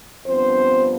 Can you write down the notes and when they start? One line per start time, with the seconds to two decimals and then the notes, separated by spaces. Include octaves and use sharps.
0.26 G2 F3 B3 C4 D4 C5